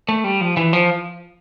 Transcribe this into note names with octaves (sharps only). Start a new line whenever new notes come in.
A3
G3
F3
E3
F3